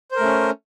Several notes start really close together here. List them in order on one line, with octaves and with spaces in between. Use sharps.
C5 A#4 A3 C#4